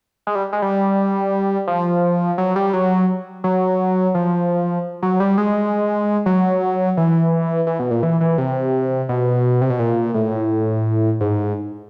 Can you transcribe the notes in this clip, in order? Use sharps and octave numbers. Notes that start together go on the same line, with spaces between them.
G#3
G3
G#3
G3
F3
F#3
G3
F#3
F#3
F3
F#3
G3
G#3
F#3
E3
E3
B2
A#2
E3
E3
C3
B2
C3
B2
A#2
A2
G#2